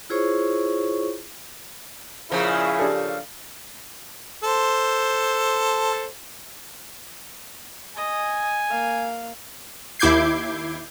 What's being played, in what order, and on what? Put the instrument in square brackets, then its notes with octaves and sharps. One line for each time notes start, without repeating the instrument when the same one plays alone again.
[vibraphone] E4 F4 G#4 C5 C#5 C#6
[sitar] A#2 C#3 F3 [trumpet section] C#4 E4 G#4
[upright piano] D4 G4 A4
[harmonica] A4 C5
[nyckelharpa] D#5 [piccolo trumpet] G#5
[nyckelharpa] A#3 F5
[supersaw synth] D#2 E4 D6 G6 G#6 C7